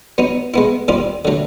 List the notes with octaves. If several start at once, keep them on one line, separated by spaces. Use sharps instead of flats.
F#3 B3 D#4
G#3 B3 E4
D#2 D#3 G3 C4 F4
D3 F#3 A3